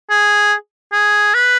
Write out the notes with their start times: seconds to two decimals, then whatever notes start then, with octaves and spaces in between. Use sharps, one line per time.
0.10 G#4
0.93 G#4
1.34 B4